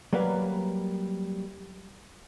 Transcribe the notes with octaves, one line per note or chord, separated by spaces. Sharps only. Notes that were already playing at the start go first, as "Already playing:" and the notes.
F#3 G3 A#3 A#4 B4 F5